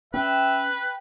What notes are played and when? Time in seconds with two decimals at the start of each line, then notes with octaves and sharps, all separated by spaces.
0.14 C#4 B4 E5 G5